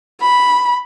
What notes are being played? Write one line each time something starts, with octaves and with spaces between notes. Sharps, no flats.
B5